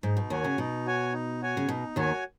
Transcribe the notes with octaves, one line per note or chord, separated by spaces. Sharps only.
G#2 D#4
B2
D#2 D#3 F#4 C#5 G#5
C#3
B2 D#4
F#4 C#5 G#5
D#4
F#4 C#5 G#5
C#3
B2 D#4
D#2 D#3 F#4 C#5 G#5